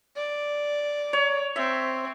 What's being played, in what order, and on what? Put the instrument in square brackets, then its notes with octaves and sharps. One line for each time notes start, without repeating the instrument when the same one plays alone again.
[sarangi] D5
[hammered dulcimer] C#5
[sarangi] C4 [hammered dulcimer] E5